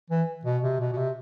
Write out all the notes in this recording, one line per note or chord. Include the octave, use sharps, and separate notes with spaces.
E3
B2
C3
B2
B2
C3